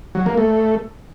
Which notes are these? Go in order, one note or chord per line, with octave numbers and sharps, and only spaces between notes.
F#3
A#3
A3